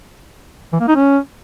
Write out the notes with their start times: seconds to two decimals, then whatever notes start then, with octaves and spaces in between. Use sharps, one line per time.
0.73 E3
0.80 A#3
0.88 D#4
0.95 C#4